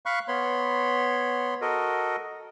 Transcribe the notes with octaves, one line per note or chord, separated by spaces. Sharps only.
F5 B5 C#6 F#6
B3 C#5 B5 C6
F#4 A4 A#4 D#5